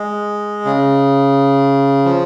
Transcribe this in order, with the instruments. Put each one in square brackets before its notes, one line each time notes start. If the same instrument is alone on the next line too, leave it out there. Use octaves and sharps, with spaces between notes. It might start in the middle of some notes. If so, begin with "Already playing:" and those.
Already playing: [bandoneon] G#3
C#3
F3